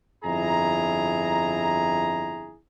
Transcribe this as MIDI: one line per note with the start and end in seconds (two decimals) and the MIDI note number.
0.24 2.58 31
0.24 2.58 41
0.24 2.58 64
0.24 2.58 68
0.24 2.58 82